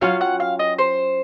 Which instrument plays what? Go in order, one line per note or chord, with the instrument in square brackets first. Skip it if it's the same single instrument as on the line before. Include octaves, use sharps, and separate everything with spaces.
[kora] F#3 C#4 F4 [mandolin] F5
[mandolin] F#5
F5
D#5
C5